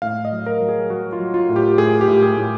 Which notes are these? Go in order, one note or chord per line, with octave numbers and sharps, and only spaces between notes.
A2 F5
D#5
F#3
A#4
F#3
G#4
F#3 F#4
F4
F#3
F4
A2
G4
A2 G#4
G4
A2
G#4
A2